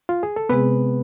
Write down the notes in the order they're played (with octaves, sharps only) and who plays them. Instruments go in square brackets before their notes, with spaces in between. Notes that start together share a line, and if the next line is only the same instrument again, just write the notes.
[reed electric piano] F4
G#4
A4
[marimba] C3 G#3 C4 G#4 [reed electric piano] B3 B4